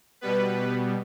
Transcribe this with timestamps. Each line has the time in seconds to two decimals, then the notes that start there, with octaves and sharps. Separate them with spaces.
0.21 B2 G3 B3 B4